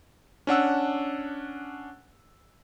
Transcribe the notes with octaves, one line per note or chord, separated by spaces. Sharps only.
C#4 D4 F#5 E6